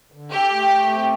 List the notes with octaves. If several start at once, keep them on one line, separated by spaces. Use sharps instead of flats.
D3
G4 A4
A3
A3
C4